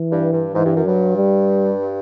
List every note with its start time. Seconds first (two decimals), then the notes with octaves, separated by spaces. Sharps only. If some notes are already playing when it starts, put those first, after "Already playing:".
Already playing: E3
0.10 G2
0.31 G2
0.53 G#2 E3
0.64 G2
0.75 F#2
0.85 G2 F#3
1.17 G3